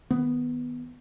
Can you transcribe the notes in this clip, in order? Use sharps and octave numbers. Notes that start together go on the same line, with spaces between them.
D#3 B3